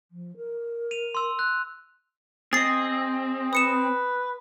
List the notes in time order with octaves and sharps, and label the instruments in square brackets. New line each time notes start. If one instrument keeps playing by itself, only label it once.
[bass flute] F3
A#4
[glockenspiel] D#7 F7
C6 E6
F#6
[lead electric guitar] C4 [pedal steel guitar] G#4 D#5 [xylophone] A6 C7
[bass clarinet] B4 [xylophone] D#6 C#7 E7